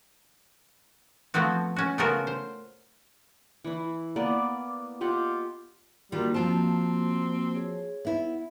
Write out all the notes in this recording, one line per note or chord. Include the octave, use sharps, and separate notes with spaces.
F3 A3 B3 C4 F#4
C#4 F#4
C#3 A3 B3 F4 F#4 A#4
C5
E3 E4
A#3 B3 D5
F4 G4 D#5 F#5
D#3 G3 A#3 F4 F#4
F3 C4 F4 A5
G#4 C#5
B3 E4 E5